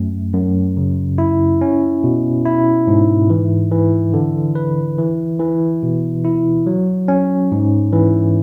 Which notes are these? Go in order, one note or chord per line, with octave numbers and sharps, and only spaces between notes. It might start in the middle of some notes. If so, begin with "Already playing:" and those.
Already playing: F#2 A3
F#2
C#3
E4
C#4
B2
E4
G#2
E3
E3
D3
B4
E3
E3
B2
E4
F#3
C#4
G#2
E3